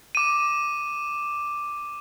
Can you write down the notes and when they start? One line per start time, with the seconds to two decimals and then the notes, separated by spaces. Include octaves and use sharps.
0.15 D6 D#7